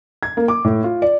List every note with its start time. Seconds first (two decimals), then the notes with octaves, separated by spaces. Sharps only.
0.23 G#6
0.37 A#3
0.48 D6
0.64 A2
0.84 F4
1.02 D5